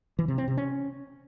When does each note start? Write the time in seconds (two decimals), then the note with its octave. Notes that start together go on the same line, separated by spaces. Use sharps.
0.19 E3
0.28 C3
0.38 C4
0.48 C3
0.57 C#4